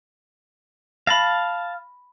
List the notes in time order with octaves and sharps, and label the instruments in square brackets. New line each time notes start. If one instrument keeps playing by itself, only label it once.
[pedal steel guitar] F5 A5 [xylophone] B5 A#6